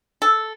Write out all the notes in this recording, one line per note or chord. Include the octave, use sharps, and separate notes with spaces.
A4